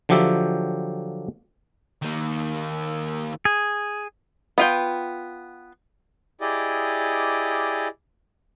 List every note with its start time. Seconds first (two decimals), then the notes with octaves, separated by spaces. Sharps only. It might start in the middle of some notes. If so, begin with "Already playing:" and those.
0.09 D3 F3 F#3 G4 E5 G5
2.02 D#3 A#3
3.45 G#4
4.58 B3 F4 G5
6.41 E4 G4 G#4 D5 D#5